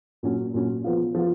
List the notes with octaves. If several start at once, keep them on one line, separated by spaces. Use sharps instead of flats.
A#2 F#3 C#4
A#2 F#3 C#4
F3 B3 F4
F3 B3 F4